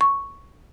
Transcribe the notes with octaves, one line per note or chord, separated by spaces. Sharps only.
C#6